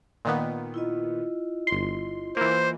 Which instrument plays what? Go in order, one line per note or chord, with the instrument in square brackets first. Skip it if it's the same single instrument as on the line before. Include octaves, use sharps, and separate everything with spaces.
[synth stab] A#2 D#3 B3
[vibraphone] E4 F4 D#5
[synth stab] G1 C6
[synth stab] E3 A#3 [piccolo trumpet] C5